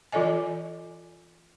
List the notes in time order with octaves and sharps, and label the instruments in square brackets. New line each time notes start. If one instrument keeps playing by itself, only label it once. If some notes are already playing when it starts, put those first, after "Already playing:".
[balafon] E3 F4 A4 D5 D#5 G#5